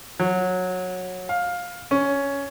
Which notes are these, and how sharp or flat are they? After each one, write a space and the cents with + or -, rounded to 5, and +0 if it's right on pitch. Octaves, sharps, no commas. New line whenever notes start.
F#3 -15
F5 +15
C#4 +10